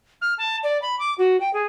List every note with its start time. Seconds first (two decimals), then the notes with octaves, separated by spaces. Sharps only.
0.21 F6
0.38 A5
0.63 D5
0.82 B5
0.99 D6
1.18 F#4
1.41 G5
1.54 G#4